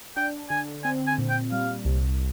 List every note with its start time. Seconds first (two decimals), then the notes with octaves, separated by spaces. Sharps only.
0.17 D4 G5
0.50 D3 G#5
0.84 C4 G#5
1.07 G#5
1.18 A#2
1.30 G5
1.52 G3 F5
1.85 C2